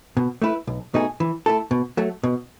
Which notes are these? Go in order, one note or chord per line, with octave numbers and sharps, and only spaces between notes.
B2
A3 E4 B4
B1
B2 A3 D#4 G#4
E3
A3 E4 A4
B2
F#3 A3
B2